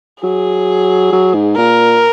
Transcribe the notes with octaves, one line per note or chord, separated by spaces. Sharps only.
F#3 G#4
F#3
G#2
A#2 A#4